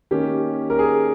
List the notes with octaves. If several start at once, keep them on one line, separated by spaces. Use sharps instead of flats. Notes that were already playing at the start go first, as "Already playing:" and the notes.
D#3 A#3 C#4 G4
A#4
G#4